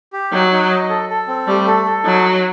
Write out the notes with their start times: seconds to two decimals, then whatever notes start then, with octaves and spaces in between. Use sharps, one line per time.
0.13 G4
0.33 F#3 D#4
0.52 D#4
0.70 D#5
0.89 A4
1.10 A4
1.28 C4
1.47 G3 A3
1.67 A4
1.85 A4
2.04 F#3 D#4
2.24 F#4